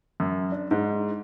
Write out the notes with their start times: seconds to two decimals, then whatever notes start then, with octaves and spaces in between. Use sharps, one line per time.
0.20 F#2
0.52 D4
0.71 G#2